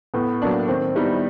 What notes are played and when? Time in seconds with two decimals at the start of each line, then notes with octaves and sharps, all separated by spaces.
0.14 A2 B3
0.42 F#3 A#3 D4
0.68 D#3 C4
0.95 G3 B3 D#4 E4